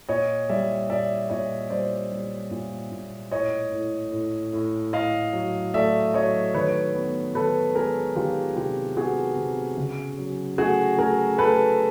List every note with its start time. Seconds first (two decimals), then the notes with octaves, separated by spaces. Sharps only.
0.09 A#2 C#5 D#5
0.49 G3 D5 E5
0.90 A#2 D5 E5
1.30 A#2 C#5 D#5
1.70 G3 C5 D5
2.11 G3
2.51 A#2
2.92 A#2
3.32 A2 C#5 D#5
3.72 A2
4.12 A2
4.53 A2
4.93 A2 D#5 F5
5.33 F#3
5.74 A3 D5 E5
6.14 F#3 C#5 D#5
6.54 D#3 B4 C#5
6.95 B3
7.35 D#3 A4 B4
7.75 G#3 G#4 A#4
8.15 D#3 F4 G4
8.56 C3 F4 G4
8.97 B3 F#4 G#4
9.37 C3
9.77 C#3
10.18 F#3
10.58 A3 F#4 G#4
10.98 A3 G#4 A#4
11.38 A3 A4 B4